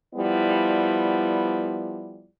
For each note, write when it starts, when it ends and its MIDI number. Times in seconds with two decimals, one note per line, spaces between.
0.15 2.28 53
0.15 2.28 55
0.15 2.28 59
0.15 2.28 64
0.15 2.28 74